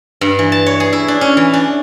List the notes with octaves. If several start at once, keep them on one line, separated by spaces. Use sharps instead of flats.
G2
E3
A5
C#5
G#4
E4
D4
C#4
E3
D4